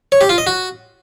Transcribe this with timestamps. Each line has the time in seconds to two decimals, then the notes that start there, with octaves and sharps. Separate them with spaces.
0.12 C#5
0.21 G4
0.29 F4
0.38 D#5
0.47 F#4